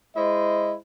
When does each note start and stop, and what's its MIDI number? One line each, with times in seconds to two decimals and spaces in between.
0.16 0.75 56
0.16 0.75 64
0.16 0.75 72
0.16 0.75 75